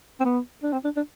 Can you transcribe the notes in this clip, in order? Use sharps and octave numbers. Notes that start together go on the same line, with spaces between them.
C4
B3
D4
C4
D4
D4